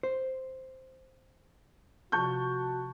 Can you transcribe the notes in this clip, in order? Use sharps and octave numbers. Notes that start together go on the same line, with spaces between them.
C5
C3 F3 F4 F#4 A5 C#6 G6